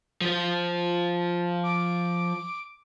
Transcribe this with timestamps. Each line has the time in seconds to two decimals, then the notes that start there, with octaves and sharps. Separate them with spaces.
0.21 F3 C5
1.63 D6